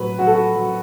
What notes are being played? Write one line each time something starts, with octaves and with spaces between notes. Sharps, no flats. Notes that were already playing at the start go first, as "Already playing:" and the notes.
Already playing: A2 F#3 B4
F#3 F#4
A4
F#4
F#3